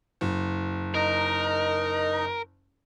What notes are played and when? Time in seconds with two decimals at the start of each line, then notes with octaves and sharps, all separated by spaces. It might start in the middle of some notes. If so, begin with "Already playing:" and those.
0.21 F#1
0.94 D#4 A#4 D#5